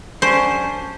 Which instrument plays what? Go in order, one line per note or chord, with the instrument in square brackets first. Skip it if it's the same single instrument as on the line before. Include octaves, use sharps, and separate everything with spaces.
[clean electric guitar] F#3 C#4 D4 [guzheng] C5